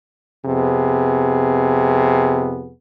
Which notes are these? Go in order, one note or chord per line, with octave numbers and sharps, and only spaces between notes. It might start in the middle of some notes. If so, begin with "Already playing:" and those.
F2 C3 B3 G#4